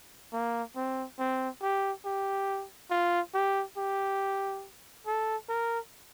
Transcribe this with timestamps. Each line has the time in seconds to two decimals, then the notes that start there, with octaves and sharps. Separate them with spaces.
0.33 A#3
0.76 C4
1.19 C4
1.62 G4
2.05 G4
2.91 F4
3.34 G4
3.77 G4
5.07 A4
5.49 A#4